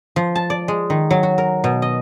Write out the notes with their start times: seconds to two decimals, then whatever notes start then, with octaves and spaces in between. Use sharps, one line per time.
0.16 F3
0.36 A5
0.50 D5
0.68 G#3
0.90 D#3
1.10 F#3
1.23 F#4
1.38 A#4
1.64 B2
1.82 D#5